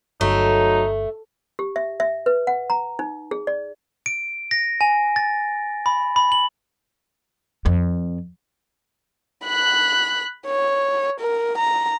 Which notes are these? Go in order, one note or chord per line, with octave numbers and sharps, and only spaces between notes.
G1 F#3 A3 D#4
G4
E5
E5
B4
F#5
A#5
D#4
G#4
D5
D7
A#6
G#5
A6
B5
B5
F#7
F2
B5 F#6
C#5
A#4
A#5